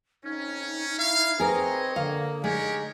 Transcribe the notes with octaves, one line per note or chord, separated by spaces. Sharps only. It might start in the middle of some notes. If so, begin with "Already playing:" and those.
F2 C#4 D#4
E4 C#5 F5
C4 G#4 A#4 B4 C#5 D#5
D3 A#3 F5
G#3 D#4 G4 A#4 C#5